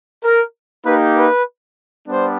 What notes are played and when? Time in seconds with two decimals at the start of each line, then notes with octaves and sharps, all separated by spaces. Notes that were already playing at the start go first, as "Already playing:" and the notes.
0.24 A#4
0.85 A#3 D#4 G4 B4
1.15 B4
2.07 G3 B3 D4 C5